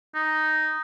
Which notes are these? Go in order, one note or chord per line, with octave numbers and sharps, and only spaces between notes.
D#4